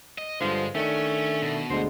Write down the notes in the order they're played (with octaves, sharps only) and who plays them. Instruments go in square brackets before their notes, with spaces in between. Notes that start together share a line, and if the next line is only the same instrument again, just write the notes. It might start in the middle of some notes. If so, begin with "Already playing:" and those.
[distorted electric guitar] D#5
[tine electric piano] G2 D3 [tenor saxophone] F3 [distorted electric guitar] G#3
[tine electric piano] D#3 D4 [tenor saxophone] A3 [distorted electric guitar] C#4
[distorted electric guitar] B2
[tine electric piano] D2 D3 G#3 [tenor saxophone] C5